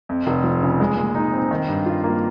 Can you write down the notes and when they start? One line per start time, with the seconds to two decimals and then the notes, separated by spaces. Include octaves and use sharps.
0.09 F2
0.27 F1
0.44 F3
0.62 C#3
0.80 G#3
0.97 A#2
1.15 D#4
1.33 C4
1.51 D#3
1.68 G2
1.86 F4
2.03 A#3